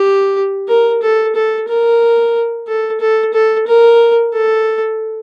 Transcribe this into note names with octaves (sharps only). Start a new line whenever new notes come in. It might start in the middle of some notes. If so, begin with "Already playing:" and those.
Already playing: G4
A#4
A4
A4
A#4
A4
A4
A4
A#4
A4